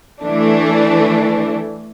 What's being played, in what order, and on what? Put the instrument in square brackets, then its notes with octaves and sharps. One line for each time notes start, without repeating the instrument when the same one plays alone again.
[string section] E3 A3 D4